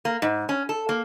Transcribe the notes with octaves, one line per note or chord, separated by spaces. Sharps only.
A#3
G#2
C#4
A4
A#3